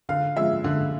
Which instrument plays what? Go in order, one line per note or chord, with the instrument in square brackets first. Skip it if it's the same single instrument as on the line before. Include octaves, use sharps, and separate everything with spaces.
[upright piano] D3 F5
F3 G#3 E5
D3